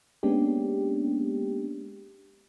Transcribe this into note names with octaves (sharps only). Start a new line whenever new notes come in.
G#3 A#3 B3 C#4 D4 G4